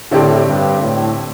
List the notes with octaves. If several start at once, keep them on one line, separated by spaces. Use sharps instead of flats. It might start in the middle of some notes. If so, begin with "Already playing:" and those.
A2 D3 C4 G4 D5
G2
A2